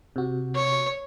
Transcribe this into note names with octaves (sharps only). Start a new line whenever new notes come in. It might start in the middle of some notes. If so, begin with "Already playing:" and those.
C3 F#4
C#5